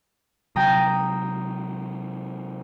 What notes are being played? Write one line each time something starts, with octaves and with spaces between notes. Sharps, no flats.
C3 F#3 G5 A#5 D#6